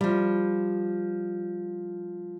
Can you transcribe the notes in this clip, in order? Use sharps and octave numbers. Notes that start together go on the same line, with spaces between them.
F3 G3